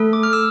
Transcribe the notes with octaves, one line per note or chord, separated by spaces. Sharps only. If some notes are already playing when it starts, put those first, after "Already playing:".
Already playing: A3 A4
D6
F6
E6